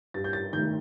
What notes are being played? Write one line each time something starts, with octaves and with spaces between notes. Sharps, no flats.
G2 A6
G6
A6
D#3 A3 G6